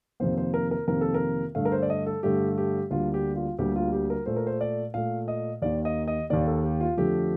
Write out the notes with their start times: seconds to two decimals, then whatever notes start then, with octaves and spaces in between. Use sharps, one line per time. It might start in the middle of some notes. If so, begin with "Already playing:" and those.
0.20 F2 C3 D#3 A#3 C5
0.38 C5
0.54 A#4
0.71 A#4
0.88 F2 C3 D#3 A#3 A#4
1.01 A4
1.14 A#4
1.55 G2 D3 A3 F5
1.65 A#4
1.72 C5
1.82 D5
1.90 D#5
2.06 A4
2.23 G2 D3 A3 G4
2.58 G4
2.90 D2 D3 G3 A#3 F4
3.14 G4
3.36 F4
3.58 D2 D3 G3 A#3 G4
3.76 F4
3.93 G4
4.10 A#4
4.26 A#2 A3 C5
4.36 A#4
4.47 C5
4.61 D5
4.94 A#2 A3 F5
5.28 D#5
5.62 D#2 D#3 A#3 D5
5.85 D#5
6.08 D#5
6.30 D#2 D#3 A#3 D5
6.47 A4
6.64 G4
6.81 F4
6.97 F2 D3 F3 A3 G4